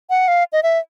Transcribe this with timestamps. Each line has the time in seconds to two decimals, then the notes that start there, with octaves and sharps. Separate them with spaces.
0.10 F#5
0.28 F5
0.52 D#5
0.63 E5